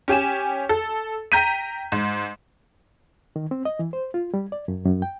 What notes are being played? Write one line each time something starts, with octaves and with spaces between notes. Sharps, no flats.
C#4 G4 G#5 E7
A4
G5 A#5 G6 B6 D#7
G#2
D#3
C4
D#5
E3
C5
F4
G3
D5
F#2
F#2
G5